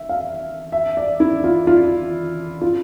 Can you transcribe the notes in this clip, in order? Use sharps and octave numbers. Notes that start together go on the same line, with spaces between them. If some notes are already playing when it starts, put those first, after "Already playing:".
Already playing: E5
F5
E5
D5
E4
F4
F4
F4